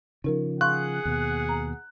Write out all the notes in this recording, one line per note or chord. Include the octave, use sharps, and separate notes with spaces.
C#3 F3 D#4 A#4
G#4 F5 F#5 C6 C#6 F#6
D#2 B2
A#5